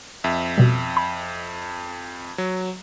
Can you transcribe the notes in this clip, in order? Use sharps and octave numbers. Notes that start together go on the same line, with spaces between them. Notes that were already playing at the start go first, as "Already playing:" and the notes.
F2 E5
B2 G3
B5
F#3